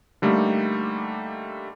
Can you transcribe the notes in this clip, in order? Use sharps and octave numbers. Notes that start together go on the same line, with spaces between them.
D3 G3 A3 A#3 D#4